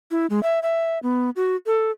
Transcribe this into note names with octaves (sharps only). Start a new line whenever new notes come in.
E4
G#3
E5
E5
B3
F#4
A4